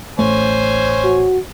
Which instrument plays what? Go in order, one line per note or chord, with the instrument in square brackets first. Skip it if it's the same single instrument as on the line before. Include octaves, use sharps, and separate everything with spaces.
[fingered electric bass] A1 A3 [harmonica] C5 C#5 G#5
[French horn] F#4